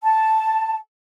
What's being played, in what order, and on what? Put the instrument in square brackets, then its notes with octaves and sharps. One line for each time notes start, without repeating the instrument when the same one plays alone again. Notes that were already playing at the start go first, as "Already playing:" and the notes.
[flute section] A5